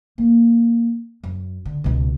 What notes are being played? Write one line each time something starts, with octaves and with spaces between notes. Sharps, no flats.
A#3
F#2
D3
C#2 B2